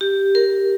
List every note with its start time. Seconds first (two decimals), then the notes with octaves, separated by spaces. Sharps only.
0.01 G4
0.35 A#4